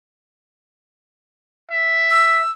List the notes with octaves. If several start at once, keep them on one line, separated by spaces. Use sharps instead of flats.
E5
E6